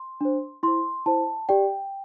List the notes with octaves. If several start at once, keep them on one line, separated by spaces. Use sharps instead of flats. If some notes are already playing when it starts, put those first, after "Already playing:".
Already playing: C6
D4 C5
E4 C5 C6
E4 C5 A5
G4 D5 G5